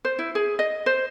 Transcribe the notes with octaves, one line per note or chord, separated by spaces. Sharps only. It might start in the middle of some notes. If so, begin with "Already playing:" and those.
C5
E4
G#4
D#5
C5